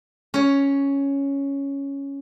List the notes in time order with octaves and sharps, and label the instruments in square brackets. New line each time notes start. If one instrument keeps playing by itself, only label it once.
[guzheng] C#4 C#5